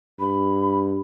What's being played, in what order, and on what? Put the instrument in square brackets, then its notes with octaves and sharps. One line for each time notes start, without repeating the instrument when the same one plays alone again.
[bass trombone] G2 [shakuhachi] B5